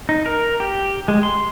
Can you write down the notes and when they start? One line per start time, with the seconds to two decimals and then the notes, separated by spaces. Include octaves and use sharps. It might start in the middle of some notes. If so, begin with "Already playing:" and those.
0.09 D#4
0.26 A#4
0.60 G4
1.08 G#3
1.23 C6